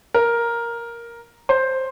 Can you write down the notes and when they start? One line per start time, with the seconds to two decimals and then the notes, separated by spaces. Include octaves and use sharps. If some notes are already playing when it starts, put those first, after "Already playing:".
0.14 A#4
1.49 C5